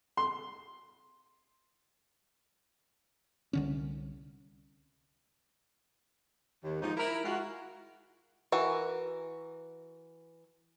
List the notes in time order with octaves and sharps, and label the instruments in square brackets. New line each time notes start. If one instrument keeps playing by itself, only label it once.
[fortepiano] C6
[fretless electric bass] C2 D3 C#4
[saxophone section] D#2
G#2 F3 D#4
E4 A#4
G#3 F4 F#4
[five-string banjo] E3 F#4 A#4